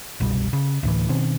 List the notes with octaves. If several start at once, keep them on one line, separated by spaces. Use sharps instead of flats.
F#1 C2 B2 G3
C#3
D2 A2 E3
B2 D#3 C4 C#4